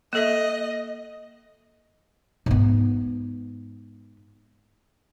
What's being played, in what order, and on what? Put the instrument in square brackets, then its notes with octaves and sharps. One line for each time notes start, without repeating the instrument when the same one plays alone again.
[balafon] A#3 A4 E5 [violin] D#5
[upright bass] G#2 B3